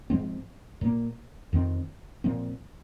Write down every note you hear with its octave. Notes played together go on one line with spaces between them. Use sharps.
G#2 F3 G#3 C4
A#2 A#3
F2 D#3 C4
A#2 F3 C4